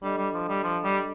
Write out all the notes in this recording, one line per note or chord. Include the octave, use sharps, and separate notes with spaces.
G3 D4 A4 D#5
G3
F3
G3
F3
G3